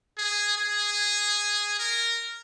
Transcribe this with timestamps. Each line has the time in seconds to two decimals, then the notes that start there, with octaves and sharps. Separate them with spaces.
0.18 G#4
0.58 G#4
1.79 A#4